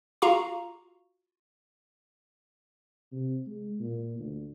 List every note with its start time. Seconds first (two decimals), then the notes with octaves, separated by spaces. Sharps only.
0.22 F4 F#4 F5 A#5 C#6
3.12 C3
3.47 G#3
3.79 A#2
4.19 D2